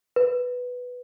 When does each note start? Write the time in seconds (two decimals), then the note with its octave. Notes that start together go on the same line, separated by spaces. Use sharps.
0.16 B4